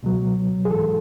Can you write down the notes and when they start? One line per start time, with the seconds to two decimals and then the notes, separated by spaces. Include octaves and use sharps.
0.03 C#2 B2 F#3
0.65 G#4
0.70 G#2 E3 A4